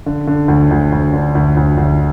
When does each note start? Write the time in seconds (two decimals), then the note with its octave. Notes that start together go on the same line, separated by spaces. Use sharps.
0.06 D3
0.27 D3
0.48 D2
0.71 D2
0.93 D2
1.13 D3
1.35 D2
1.57 D2
1.78 D2